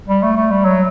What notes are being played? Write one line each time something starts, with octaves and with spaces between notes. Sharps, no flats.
G3
A3
A3
G3
F#3